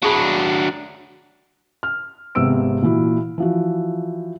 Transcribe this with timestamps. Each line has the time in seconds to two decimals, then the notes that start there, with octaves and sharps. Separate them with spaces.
0.02 F#3 D4 F#4 G#4 B5
1.83 F6
2.35 G#1 C3 B3 C4 E6 D7
2.82 A#2 E3 E4 F#4
3.38 E3 F3 F#4